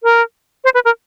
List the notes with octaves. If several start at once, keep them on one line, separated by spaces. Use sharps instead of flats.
A#4
C5
B4
A#4